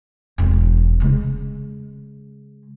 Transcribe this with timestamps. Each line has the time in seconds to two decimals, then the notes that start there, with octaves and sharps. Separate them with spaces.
0.38 E1 C4
1.00 C#3 G#3